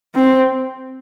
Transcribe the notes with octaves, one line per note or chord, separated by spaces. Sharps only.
C4